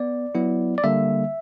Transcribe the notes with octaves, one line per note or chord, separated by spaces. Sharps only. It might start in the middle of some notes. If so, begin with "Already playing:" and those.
Already playing: B3 D5
F#3 B3 E4
D5
D3 G3 A#3 E5